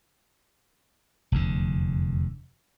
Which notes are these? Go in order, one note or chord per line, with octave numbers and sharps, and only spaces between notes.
F1 E2 D3